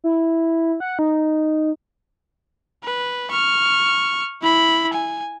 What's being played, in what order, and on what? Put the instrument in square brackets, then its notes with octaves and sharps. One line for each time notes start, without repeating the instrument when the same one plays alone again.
[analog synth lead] E4
F#5
D#4
[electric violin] B4
C#6 F6
E4 B5
G#5